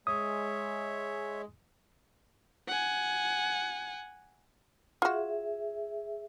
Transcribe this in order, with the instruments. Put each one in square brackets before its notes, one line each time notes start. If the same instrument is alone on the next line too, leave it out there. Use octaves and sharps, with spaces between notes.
[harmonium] G#3 [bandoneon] C#5 E5 [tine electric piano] D#6
[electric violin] F#5 G#5
[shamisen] F4 F#4 [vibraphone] G#4 E5